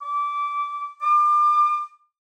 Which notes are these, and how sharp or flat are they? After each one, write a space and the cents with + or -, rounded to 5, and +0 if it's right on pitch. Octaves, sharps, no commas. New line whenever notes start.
D6 -20
D6 +35